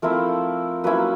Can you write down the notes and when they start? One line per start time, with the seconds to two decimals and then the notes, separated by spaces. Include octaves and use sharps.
0.02 F3 A3 C4 E4 A#4
0.84 F#3 A#3 C#4 E4 B4